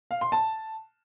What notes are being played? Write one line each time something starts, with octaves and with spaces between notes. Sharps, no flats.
F5
C6
A5